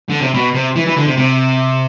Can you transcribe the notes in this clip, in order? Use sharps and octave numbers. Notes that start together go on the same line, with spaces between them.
D3
C3
B2
C3
E3
E3
D3
C3
C3